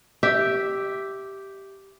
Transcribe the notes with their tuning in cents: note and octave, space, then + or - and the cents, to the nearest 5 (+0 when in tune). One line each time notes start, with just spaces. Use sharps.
G4 -5 E5 +0